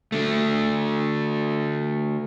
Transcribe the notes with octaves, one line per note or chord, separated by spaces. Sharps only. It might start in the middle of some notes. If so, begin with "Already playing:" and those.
D3 A3